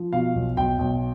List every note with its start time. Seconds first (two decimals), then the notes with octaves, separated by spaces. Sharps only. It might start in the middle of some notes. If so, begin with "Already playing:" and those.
Already playing: F3
0.13 B2 F5
0.35 B1
0.57 B1 G5
0.79 B1